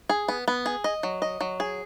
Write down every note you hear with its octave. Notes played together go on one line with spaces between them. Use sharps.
G#4
B3
B3
G#4
D#5
F#3
D#5
F#3
G#4